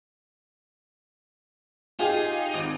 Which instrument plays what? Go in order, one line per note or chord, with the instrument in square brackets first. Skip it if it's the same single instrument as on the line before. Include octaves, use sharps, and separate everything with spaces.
[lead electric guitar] D#4 [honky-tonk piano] F4 G4 G#4
[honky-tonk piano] G#1